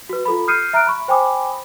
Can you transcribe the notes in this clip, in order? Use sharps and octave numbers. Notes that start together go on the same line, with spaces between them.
F#4 B4
F4 A4 B5
D#6 F6 G6 C7 C#7 D#7
E5 A#5 F6 F#6 D7
B5 C#6
C5 G5 G#5 B5 D6 D#6